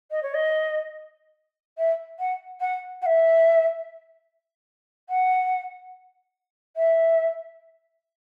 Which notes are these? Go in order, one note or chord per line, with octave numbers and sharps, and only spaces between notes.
D#5
C#5
D#5
E5
F#5
F#5
F#5
E5
F#5
E5